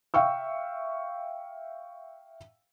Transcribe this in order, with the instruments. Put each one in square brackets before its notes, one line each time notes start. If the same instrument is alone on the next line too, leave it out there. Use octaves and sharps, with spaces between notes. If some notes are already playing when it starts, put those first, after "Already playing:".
[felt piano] E5 F5 G5 C#6 E6